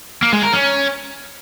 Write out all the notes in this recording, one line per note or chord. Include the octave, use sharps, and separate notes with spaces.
A#3
G#3
A#4
C#4